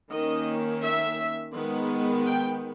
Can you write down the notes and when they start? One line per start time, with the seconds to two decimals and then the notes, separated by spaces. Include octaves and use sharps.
0.11 D#3 A#3 C#4 D#5
0.83 E5
1.55 D#3 G#3 B3
2.27 G5